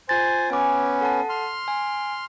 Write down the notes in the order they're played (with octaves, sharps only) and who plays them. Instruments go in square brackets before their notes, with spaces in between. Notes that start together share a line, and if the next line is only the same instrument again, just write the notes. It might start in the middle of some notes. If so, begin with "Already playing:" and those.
[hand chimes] F4 A6 [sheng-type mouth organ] C5 G#5
[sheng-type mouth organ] B3 C#4 [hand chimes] G#5 D6
[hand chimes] A4 F#5 A5
[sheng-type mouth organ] C6 F6
[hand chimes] G#5